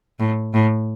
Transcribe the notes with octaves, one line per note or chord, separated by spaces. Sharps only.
A2
A2